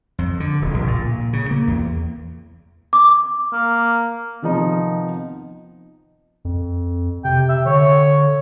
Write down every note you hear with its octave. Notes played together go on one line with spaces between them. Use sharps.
F2
D3
D#1
A#1
A#2
A#2
C#3
A#3
E2
D6
A#3
C3 D#3 F3 B3 D#4
F2
C3 G5
E5
D3 C#5